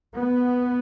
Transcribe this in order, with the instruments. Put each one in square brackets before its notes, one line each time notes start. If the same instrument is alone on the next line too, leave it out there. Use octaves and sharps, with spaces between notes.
[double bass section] B3